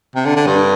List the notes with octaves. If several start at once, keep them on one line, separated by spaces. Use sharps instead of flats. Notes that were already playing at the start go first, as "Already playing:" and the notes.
C3
D3
D3
G2